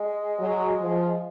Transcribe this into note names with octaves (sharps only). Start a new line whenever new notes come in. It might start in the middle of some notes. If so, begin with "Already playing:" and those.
Already playing: G#3
F#3
F3